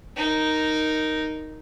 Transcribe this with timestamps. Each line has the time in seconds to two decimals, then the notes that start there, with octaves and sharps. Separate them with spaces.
0.16 D#4 A#4